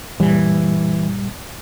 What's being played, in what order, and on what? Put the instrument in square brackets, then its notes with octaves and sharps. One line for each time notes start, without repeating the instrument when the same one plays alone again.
[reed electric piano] F#2 A#2 G3 [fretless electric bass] E3